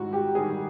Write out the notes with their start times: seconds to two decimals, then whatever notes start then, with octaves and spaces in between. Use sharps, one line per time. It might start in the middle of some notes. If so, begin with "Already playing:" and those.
Already playing: G#2 D#3 G3 E4 F#4
0.13 G4
0.35 D#3 G3 G#4